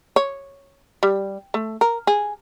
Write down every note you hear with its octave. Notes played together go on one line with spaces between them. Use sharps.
C#5
G3
A3
A#4
G#4